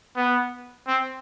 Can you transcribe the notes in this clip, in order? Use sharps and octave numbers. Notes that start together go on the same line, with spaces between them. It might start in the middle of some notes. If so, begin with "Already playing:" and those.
B3
C4